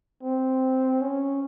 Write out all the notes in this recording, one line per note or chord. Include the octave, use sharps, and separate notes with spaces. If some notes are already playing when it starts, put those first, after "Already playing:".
C4
C#4